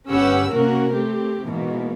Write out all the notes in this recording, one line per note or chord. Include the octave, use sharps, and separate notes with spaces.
G1 C#4 G4 B4 F#5 E6
C3 A#3 C#4 F#4 A#4
A3 C4 G4
G#2 B2 E3 A#3